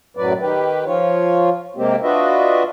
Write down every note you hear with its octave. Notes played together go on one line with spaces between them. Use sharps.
F#2 A2 F#3 B4 D5
D#3 G4 B4
F3 F4 C#5
C3 G#3 A#3 C4 G4
D4 F4 F#4 B4 D#5 E5